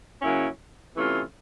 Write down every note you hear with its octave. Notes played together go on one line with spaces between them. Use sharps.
C#3 F#3 A#3 C#4 E4
C3 E3 A3 C#4 F4